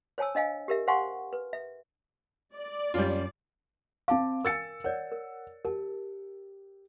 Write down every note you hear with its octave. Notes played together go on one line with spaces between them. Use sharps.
C5 C#5 G#5 A5 E6
D4 D#5 F5 G#5
G4 A#4 E5
C5 F5 F#5 G#5 C6 C#6
B4
E5
D5
F#2 G3 C#4 F4
C4 F5 A5 D6
A#4 G5 G#5 E6 A6 C#7
A#4 C#5 D5 F#5
A#4
G4 A#4 A5